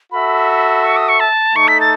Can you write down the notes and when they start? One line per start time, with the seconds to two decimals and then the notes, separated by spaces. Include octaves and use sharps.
0.12 F#4 A4 E5 B5
0.84 C#6
0.97 D#6
1.09 C#6
1.20 A5
1.55 A3 D#4 A4 C#6
1.68 B6
1.80 A6